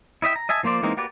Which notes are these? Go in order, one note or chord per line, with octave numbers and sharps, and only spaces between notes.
E4 D#5 E5 G5
A#5
D#5 E5 G#5 A5
F3 A#3 F4 C5 D5
E3 G#3 A#3 C4 D#4
A#3 F#4 G4 B4 D5